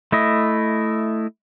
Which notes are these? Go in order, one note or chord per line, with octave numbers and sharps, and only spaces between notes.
A3 E4 D#5